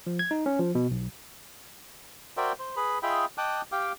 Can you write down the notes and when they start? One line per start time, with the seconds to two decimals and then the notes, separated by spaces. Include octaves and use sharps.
0.07 F3
0.19 G#6
0.31 D#4
0.46 C#4
0.59 F3
0.75 B2
0.91 B1
2.37 F#4 A#4 C5 D5 E5 G5
2.59 C5
2.77 G#4 B4 B5
3.03 F4 G#4 D#5 E5 G5 B5
3.38 D#5 G5 A5 D6 D#6 F#6
3.72 G4 F5 G5 D6